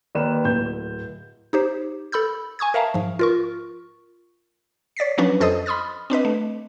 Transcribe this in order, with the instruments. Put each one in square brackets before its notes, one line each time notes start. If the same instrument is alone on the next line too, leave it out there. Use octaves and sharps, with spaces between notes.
[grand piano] D#2 B4 D5 E7
D1 G6
[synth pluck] D#4 G4 C5
A4 B5 E6 G6
G#5 C#6 D#6 G#6
A#4 E5 F5 A5 A#5
G#2 F3
F4 A#4 C#6
C#5 D5 A6 B6 C7
F3 F#3 C#4 D4 B4
F2 A4 C5 D#5 D#6
B5 C6 D#6 F6 A6
C4 D4 B4 D#5
A3